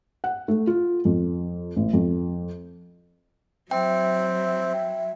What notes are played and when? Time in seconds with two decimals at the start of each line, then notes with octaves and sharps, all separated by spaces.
0.24 F#5
0.48 A3
0.67 F4
1.05 F2
1.76 A1
1.93 F2
3.71 F#3 C4 E5 G5